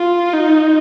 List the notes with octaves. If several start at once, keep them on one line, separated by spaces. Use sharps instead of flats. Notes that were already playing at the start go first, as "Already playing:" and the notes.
Already playing: F4
D#4